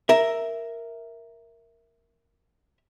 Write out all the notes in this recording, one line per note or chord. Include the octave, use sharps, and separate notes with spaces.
A#4 E5